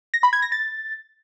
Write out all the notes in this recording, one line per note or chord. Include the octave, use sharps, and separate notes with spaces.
A#6
B5
G#6
A#6
A6